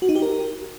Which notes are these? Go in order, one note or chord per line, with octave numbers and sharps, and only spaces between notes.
F#4
D#4
G4
A#4